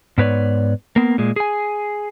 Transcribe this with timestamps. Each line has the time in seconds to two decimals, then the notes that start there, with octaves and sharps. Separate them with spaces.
0.18 G#2 B3 B4 C#5 D5
0.96 A#3 B3
1.18 A#2 G#3
1.36 G#4 G#5